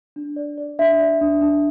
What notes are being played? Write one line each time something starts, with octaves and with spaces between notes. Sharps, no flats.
D4
D5
D5
D4 E5
D5
D4
D4